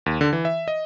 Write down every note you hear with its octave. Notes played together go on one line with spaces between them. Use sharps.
D#2
D3
E3
E5
D#5